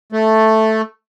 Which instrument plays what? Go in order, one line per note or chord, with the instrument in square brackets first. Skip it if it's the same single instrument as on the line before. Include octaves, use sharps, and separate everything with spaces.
[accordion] A3